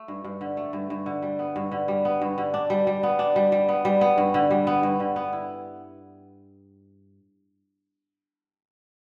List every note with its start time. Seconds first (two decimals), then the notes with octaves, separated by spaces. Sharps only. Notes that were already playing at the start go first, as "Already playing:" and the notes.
Already playing: A3
0.08 G2
0.24 G2
0.41 D3
0.57 A3
0.73 G2
0.90 G2
1.06 D3
1.22 G3
1.39 B3
1.56 G2
1.72 D3
1.88 G3
2.05 B3
2.22 G2
2.38 D3
2.54 D4
2.70 G3
2.87 G3
3.03 B3
3.19 D4
3.36 G3
3.52 G3
3.69 B3
3.85 G3
4.01 B3
4.18 G2
4.34 D3
4.51 G3
4.67 B3
4.83 G2
5.00 D3
5.16 B3
5.33 E4